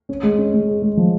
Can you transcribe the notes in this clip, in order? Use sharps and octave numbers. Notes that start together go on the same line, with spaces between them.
C#4
G#3
C#4
G#3
G#4
G#3
F3